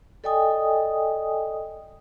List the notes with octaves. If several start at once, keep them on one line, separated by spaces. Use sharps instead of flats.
A4 D5 D#5 G5 G#5 D#6